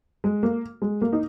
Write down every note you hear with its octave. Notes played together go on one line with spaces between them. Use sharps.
G#3
A#3
G#3
A#3
D#4